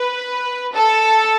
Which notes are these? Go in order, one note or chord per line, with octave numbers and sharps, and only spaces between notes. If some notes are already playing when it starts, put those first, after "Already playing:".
Already playing: B4
A4